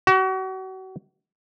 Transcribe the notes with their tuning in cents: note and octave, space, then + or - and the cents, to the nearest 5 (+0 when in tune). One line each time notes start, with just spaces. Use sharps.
F#4 +35